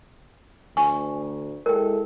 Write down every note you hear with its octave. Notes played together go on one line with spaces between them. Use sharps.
D2 G#5 C#6
G#3 E4 A4 A#4 G5